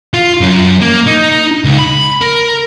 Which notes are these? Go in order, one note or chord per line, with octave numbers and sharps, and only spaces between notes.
F4
F#2
A#3
D#4
C#2
B5
A#4